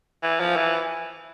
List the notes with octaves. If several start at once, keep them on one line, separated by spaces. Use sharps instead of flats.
E3
F3
E3